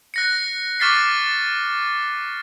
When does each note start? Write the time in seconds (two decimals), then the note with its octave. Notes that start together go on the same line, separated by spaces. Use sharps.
0.14 F#6 A#6 C#7
0.80 C#6 D6 F6 A6 B6 C7